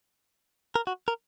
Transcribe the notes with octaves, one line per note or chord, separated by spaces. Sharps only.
A#4
F#4
A#4